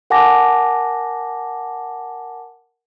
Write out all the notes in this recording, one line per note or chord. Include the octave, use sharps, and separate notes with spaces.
A#4 F#5 G#5 A5 D6 A#6